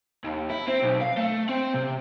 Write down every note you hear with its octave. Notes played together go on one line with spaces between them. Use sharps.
D#2
E4
C4
B1
F5
A3
C4
C3